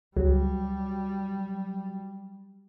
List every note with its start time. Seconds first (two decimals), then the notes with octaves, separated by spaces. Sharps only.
0.17 C#2 F#3 G3